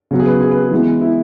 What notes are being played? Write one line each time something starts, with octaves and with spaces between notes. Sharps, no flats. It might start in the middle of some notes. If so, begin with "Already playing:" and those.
C#3 F#3 B3
G#4
B4
G#4
B4
G#4
E3 G#3 B3
E4